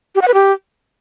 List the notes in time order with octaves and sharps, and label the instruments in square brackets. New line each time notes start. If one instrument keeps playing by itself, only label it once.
[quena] G4
F#5
B4
G4